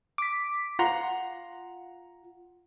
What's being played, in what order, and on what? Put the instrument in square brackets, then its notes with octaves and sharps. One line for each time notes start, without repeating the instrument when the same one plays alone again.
[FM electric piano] D6 B6
[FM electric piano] F4 [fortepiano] F#5 A#5 C6